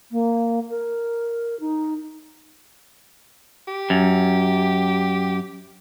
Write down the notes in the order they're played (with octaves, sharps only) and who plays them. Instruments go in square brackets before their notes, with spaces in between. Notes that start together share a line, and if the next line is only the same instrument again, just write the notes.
[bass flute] A#3
A#4
D#4
[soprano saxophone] G4
[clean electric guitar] F#2